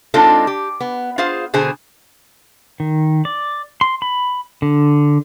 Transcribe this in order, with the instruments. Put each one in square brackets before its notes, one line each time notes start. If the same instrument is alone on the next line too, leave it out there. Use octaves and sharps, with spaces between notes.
[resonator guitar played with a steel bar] G#3 C4 D4 D#4 F4 A4
G4
B3
F4 G#4 C5 F5
B2 D3 G#4 C5 G#5
[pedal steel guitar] D#3
D5
C6
B5
D3